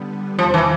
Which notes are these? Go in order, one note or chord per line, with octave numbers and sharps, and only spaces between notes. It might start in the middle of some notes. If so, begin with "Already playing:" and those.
Already playing: D3 G3 B3
E2 C3 D#3 F3
E3